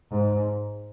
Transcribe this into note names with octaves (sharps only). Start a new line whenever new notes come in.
G#2